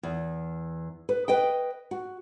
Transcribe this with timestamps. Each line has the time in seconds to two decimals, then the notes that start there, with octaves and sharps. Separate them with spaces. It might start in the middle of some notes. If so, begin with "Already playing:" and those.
0.03 E2
1.09 B4
1.28 B4 D#5 G5
1.91 F#4